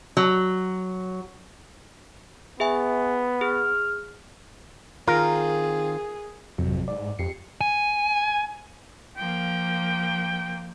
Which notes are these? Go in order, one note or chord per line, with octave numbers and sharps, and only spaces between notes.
F#3
B3 G#4 E5 G#5
G#4 F6
D#3 C4 F4 G#4 A#4
G#1 F2 C3 F#3
G#2 D5
F2 G4 C7 C#7
G#5
F3 A#3 G5